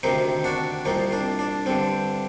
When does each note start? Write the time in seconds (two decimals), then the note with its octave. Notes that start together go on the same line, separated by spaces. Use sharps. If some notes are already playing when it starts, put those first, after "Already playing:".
0.03 D2 C3 D#3 C4 D#4
0.44 D4 F#4
0.85 C2 A#2 C4 D#4
1.12 D4
1.39 D4
1.66 G2 D3 C4